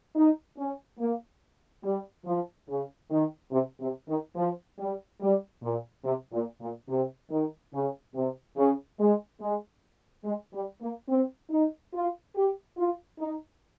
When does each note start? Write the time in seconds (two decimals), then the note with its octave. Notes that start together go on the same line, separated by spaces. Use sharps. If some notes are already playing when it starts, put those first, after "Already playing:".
0.16 D#4
0.58 C#4
1.00 A#3
1.84 G3
2.26 F3
2.69 C#3
3.11 D#3
3.52 C3
3.80 C3
4.09 D#3
4.36 F3
4.79 G3
5.21 G3
5.62 A#2
6.05 C3
6.33 A#2
6.61 A#2
6.89 C3
7.31 D#3
7.74 C#3
8.15 C3
8.57 C#3
9.00 G#3
9.41 G#3
10.25 G#3
10.54 G3
10.82 A#3
11.09 C4
11.51 D#4
11.94 F4
12.36 G4
12.77 F4
13.19 D#4